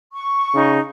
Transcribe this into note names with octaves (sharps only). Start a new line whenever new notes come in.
C#6
C#3 D#4